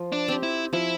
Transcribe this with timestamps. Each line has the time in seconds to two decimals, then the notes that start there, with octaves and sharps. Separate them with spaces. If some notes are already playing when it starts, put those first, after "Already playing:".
Already playing: F3
0.12 D4
0.28 C4 G4
0.43 E4
0.73 F3 E4